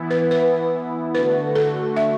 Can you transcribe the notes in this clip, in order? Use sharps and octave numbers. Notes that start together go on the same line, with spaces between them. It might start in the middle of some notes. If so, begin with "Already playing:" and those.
Already playing: E3 B3 E4
B4
B4
D3 A3 F#4 B4
A4
E5